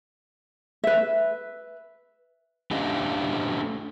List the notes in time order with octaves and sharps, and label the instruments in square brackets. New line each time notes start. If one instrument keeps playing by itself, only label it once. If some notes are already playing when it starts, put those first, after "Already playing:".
[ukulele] B4 E5
[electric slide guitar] A3 C#4 D4 G4 D#5 F5